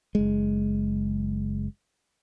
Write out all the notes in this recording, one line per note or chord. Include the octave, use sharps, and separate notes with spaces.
F#1 G#3